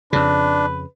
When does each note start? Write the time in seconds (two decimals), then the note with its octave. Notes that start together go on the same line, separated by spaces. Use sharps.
0.13 F2 C#3 D4 B4